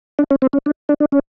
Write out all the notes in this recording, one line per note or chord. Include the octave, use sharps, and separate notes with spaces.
D4
C#4
C4
C#4
D4
D4
D4
C#4